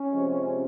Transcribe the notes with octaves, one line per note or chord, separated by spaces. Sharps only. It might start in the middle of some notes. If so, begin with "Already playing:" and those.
Already playing: C#4
C3 F3 G#3